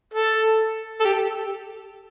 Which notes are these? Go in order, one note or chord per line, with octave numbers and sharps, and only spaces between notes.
A4
A4
G4